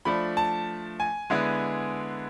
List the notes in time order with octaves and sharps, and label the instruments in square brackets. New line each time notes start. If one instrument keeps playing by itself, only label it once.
[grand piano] F3 A3 D4 B5
A5
G#5
D3 G#3 B3 E4